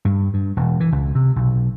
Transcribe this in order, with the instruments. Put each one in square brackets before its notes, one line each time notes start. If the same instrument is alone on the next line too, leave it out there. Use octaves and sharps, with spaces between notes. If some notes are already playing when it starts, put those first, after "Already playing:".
[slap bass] G2
G2
E1
E3
C#2
C3
B1